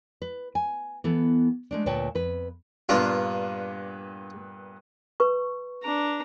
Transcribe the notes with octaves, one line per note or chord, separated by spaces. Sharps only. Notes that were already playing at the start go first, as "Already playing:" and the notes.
B4
G#5
E3 B3 A4
G#3 A3 D4
D2 A#2 B4 C#5 G5 A5
F2 B4
G2 A#2 B3 D4 F4
B4 C#6
D4 A#5